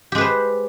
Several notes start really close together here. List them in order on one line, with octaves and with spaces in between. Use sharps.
G4 G#3 B4 C5